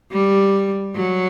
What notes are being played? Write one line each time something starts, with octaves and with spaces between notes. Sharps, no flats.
G3
F#3